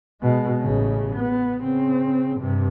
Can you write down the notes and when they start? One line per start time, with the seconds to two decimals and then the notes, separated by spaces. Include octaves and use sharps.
0.22 B2 G#3
0.61 A1 C#3
1.16 B3
1.61 C#3 C4
2.40 G2 C3